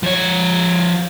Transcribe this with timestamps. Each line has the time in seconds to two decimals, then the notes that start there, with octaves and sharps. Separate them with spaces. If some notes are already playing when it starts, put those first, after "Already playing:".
0.03 F3 C#5